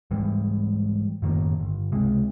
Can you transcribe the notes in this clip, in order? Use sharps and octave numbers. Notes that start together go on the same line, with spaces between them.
G#2 E3 G3 G#3
F#2 A2 D#3 A#3
G1
C#2 C3 G#3